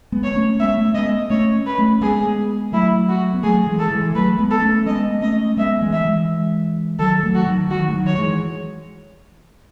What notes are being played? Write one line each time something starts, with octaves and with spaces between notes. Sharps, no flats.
G#3 B3
C#5
A3 C#4
G#3 B3 E5
A3 C#4
G#3 B3 D#5
A3 C#4 C#5
B4
A3 C#4
G#3 B3 G#4
F#3 A3 E4
F#4
B3
F#3 A3 G#4
E3 G#3
A4
E3 G#3
F#3 A3 B4
G#3 B3
A4
A3 C#4
G#3 B3 D#5
A3 C#4 D#5
G#3 B3 E5
E3 G#3
E5
E3 G#3
D#3 F#3 A4
F#3 A3
F#4
D#3 F#3
D#3 F#3 F#4
G#3
D#3 F#3
C#5
E3 G#3